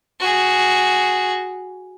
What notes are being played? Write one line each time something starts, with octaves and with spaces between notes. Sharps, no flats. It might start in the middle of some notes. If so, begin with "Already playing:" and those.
F#4 G#4